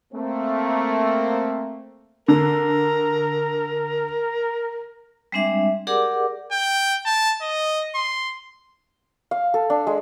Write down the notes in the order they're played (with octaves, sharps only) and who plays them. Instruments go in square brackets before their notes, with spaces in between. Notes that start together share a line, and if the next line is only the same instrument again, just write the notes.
[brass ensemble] A3 A#3 C4
[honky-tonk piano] D3 [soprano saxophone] A#4
[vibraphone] G3 G#3 C4 D4 E5
G4 G#4 A#4 D5 F#5 D6
[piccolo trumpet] G5
A5
D#5
C6
[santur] F5
A4
D4
G#3